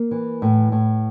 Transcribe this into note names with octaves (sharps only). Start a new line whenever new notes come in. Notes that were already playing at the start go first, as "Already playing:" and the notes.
Already playing: A#3
E3
A2
A2